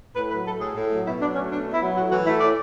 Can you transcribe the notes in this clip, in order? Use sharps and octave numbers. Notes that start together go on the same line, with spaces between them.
A2 B4
F#3 B4
A3 A4
A2 G#4
A2
F#3
B2 E4
F#3 D4
A3 C#4
B2 D4
B2
E4
F#3
A2 F#4
E3 F#4
A3 E4
A2 D5